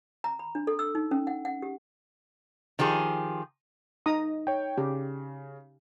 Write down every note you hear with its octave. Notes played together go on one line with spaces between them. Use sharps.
A#5
B5
D4
A4
E6
D#4
C#4
F#5
F#5
G4
D#3 F3 G4 G#4
D#4 A#5 D#6
C#5 G5
C#3 G4